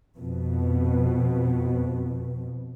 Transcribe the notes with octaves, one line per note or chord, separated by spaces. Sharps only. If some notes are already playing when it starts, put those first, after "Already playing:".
F2 B2